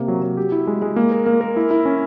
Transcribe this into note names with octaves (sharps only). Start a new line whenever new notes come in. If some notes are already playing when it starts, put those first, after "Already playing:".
Already playing: C3 A#3
F#3
F#3
G4
E4
G#3
G#3
A#3
A#4
A#3
A#4
E4
E4
C#4